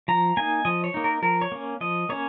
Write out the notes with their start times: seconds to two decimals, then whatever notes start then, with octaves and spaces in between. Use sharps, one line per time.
0.08 F3 A#5
0.37 A#3 D#4 G#5
0.65 F3 D#5
0.84 C#5
0.94 A#3 D#4
1.04 A#4
1.22 F3 A#4
1.42 C#5
1.52 A#3 C#4
1.81 F3 D#5
2.09 A#3 C#4 C#5